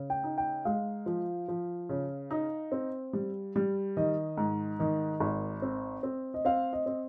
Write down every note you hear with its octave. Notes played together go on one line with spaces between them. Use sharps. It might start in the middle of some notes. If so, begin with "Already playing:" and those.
Already playing: C#3
G5
D#4
G5
G#3 F5
F3
F3
C#3
D#4
C4
G3
G3
D#3 D#5
G#2
D#3 D#5
G#1
C4
C4
D#5
C4 F5
D#5
C4